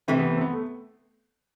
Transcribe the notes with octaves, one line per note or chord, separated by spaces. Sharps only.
C3 E3 A3 C4
B3
B3
C4
B3
A3